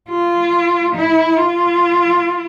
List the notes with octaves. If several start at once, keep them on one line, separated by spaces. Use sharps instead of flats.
F4
E4
F4